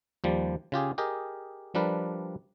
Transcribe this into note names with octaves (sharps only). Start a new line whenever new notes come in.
D#2 F3 G3
C#3 F4 G4 G#4
G4 G#4 A#4 D#5
F3 G3 D4 A#4 B4